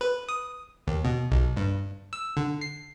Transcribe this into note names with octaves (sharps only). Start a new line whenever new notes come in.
B4
D#6
D#2
B2
B1
G2
E6
D3
C7